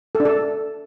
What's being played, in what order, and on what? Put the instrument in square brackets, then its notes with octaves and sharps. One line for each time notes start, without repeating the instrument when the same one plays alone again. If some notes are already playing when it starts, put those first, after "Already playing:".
[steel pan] A4
D4
A4